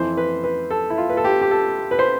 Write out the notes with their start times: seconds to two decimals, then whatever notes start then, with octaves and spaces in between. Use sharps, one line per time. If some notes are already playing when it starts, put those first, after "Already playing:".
Already playing: F2 E3 C5
0.17 B4
0.44 B4
0.70 A4
0.90 E4
0.98 F4
1.09 B4
1.17 A4
1.24 G4
1.41 G4
1.51 A4
1.91 B4
1.99 C5